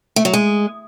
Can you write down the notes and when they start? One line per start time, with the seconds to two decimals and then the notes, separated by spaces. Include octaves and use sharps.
0.16 A3
0.25 F#3
0.34 G#3